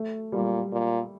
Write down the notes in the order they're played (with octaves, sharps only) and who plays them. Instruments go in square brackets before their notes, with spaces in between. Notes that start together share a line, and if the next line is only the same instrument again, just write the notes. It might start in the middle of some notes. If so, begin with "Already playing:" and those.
Already playing: [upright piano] A3
[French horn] A#2 [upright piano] G3
[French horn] A#2